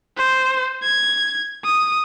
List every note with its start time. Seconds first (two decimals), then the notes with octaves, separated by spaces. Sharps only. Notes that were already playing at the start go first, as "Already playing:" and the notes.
0.17 C5
0.83 G#6
1.65 D#6